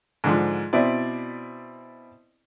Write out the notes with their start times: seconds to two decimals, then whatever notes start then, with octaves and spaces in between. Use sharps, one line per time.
0.24 G#2 D3 F3
0.73 B2 C4 E4 D5